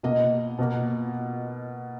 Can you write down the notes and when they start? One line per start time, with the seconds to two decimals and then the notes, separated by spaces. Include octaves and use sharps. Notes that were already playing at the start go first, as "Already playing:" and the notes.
0.03 B2 A#3 D#5
0.59 B2 A#3